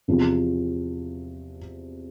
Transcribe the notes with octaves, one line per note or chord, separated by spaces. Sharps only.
E2 C3 F3